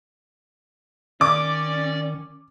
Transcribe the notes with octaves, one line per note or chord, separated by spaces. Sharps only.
D#3 C#4 D5 D6